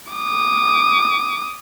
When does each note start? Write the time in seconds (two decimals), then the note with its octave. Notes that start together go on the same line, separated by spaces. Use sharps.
0.13 D6 D#6